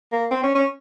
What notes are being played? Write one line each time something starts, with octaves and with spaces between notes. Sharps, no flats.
A#3
C4
C#4
C#4